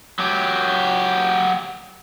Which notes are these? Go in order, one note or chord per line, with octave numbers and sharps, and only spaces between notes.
F#3 G4